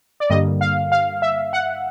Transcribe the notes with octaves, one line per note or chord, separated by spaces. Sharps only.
D5
G2 D3 G3 A#3 D#5
F5
F5
E5
F#5